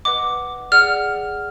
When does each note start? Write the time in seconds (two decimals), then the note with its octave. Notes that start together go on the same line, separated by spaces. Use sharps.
0.05 B4 D#5 F#5 D6
0.72 G#4 D5 F#5 F6